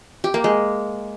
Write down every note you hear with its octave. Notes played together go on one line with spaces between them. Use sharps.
G4
A#3
G#3